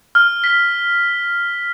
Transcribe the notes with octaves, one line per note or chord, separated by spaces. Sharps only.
F6
B6